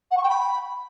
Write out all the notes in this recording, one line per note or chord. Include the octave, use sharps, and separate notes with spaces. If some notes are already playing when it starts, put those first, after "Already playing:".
F#5
C#6
G5
B5